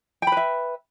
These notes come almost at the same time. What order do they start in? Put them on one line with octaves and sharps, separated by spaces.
G5 B5 B4 E5